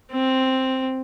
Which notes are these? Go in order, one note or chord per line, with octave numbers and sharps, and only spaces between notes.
C4